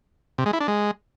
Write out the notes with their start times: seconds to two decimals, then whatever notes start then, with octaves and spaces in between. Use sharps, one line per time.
0.38 C3
0.46 G#3
0.53 E4
0.60 D4
0.68 G#3